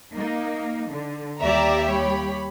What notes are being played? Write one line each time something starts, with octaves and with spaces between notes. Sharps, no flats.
A#3 D#4
D3
D#2 G3 G4 D5 E5 A#5
C#5 B5